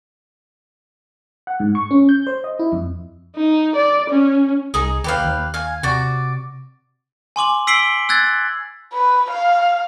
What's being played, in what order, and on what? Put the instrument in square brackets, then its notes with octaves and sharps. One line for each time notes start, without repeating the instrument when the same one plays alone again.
[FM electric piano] F#5
G#2
C#6
C#4
G6
C5
D#5
E4
F2
[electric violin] D#4
D5
C#4
[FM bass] C2 [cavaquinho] D#4 G#4
[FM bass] D#2 [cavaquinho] G4 B4 F5
[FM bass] D#2
[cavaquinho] F5 G#5
[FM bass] C3 [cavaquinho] F#4 D5
[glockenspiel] G#5 C6 D6 F#7
E6 B6 C7 D7 F#7 G7
E6 F#6 G#6 A6
[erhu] B4
F5